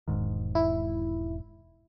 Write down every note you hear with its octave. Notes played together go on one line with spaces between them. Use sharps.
E1 G#2 D#3
E4